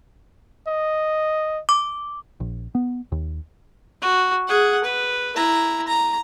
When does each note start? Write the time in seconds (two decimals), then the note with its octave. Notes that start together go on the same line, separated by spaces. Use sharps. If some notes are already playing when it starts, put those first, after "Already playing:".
0.68 D#5
1.69 D6
2.40 A#1
2.75 B3
3.12 D#2
4.02 F#4
4.48 G#4 F#5
4.84 B4
5.36 E4 A#5
5.88 A#5